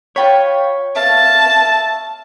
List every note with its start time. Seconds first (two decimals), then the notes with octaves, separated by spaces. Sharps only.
0.16 F4 C#5 G5 B5
0.96 E5 F5 A5